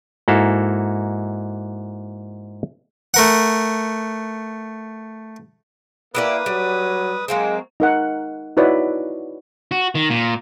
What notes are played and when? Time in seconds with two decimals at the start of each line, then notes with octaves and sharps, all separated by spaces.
0.28 G#2 A#3 E4 F#4 A4 F5
3.14 A3 A#4 F#5
6.15 A#3 E4 G4 B4 D5 D#6
6.46 F#3 G3
7.28 F#3 G#3 A#3 C4
7.80 D#4 A#4 F#5
8.57 D#4 E4 F#4 B4 C#5 D5
9.71 F#4
9.95 D#3
10.10 A#2